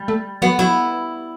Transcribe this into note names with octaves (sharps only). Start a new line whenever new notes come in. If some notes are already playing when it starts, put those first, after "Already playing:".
Already playing: G3
A3
F#3 B3
F#3 E4